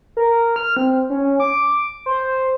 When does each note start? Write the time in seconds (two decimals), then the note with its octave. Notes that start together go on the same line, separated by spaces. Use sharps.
0.17 A#4
0.56 F6
0.77 C4
1.10 C#4
1.40 D6
2.06 C5